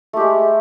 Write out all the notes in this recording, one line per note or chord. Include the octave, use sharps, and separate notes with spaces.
G#3 A3 G4